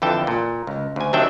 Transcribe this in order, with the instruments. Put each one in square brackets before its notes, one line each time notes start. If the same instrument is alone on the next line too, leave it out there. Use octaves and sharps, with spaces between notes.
[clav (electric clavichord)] F2 D3 E3 G5 A5
A#2
C#2
D2 G#5
C3 D#3 F#3 D4 E5 G5